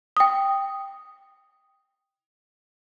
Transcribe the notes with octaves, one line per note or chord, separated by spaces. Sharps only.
G5 D#6